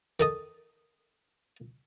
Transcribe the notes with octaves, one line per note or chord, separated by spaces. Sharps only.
D#3 A4 D#5